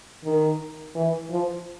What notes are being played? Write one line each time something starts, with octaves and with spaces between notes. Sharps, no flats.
D#3
E3
F3